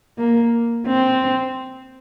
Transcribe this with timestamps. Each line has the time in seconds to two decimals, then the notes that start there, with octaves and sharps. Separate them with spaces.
0.18 A#3
0.87 C4